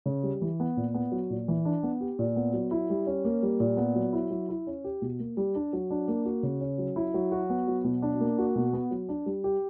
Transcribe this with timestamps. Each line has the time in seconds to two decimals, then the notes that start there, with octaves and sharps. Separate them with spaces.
0.06 C#3
0.23 G3
0.42 E3
0.60 B3
0.77 A#2
0.94 B3
1.12 F#3
1.30 A#2
1.48 E3
1.65 D4
1.83 B3
2.01 G4
2.19 A#2
2.36 B3
2.53 F#3
2.71 E4
2.90 G3
3.07 C#4
3.25 A#3
3.43 G3
3.60 A#2
3.77 B3
3.95 F#3
4.13 E4
4.31 F#3
4.49 E4
4.67 C#4
4.84 G4
5.02 B2
5.19 A#3
5.37 G3
5.55 D4
5.73 F#3
5.91 D4
6.08 A#3
6.25 F#4
6.43 C#3
6.60 C#4
6.78 F#3
6.96 E4
7.14 F#3
7.32 F#4
7.50 B3
7.68 F#3
7.84 B2
8.02 D4
8.20 A#3
8.38 F#4
8.55 B2
8.73 B3
8.91 F#3
9.09 D4
9.26 G3
9.44 G4